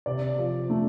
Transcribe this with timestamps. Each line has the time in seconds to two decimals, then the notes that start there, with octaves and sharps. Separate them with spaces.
0.06 C3 D5
0.38 F3
0.70 A3